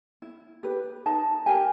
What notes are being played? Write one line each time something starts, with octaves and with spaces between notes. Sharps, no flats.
E4
G4 B4
D#4 A5
G4 A#4 G#5